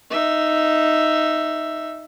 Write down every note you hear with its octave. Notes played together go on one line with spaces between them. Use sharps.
D#4 E5